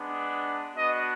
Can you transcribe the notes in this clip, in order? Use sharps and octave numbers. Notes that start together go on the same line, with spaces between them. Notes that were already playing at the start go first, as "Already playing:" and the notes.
Already playing: G#3 B3 D4
B3 D4 F#4 D#5